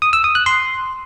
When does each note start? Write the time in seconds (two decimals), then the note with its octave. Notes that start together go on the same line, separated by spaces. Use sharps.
0.02 D#6
0.13 E6
0.24 D#6
0.35 F#6
0.46 C6